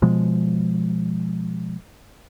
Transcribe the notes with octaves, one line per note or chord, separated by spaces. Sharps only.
B2 F3 G#3